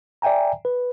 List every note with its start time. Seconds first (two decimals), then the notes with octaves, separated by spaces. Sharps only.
0.22 D5 E5 G5 G#5 A#5
0.65 B4